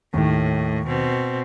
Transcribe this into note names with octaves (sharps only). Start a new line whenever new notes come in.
D#2 A2 D#3
B2 C4